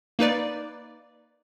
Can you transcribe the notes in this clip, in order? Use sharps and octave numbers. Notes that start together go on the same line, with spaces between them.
A#3 D#4 B4 D5